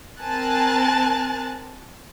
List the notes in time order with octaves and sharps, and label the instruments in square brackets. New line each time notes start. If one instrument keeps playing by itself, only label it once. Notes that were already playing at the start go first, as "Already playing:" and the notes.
[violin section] C4 A#4 G#5 A5 F#6 A6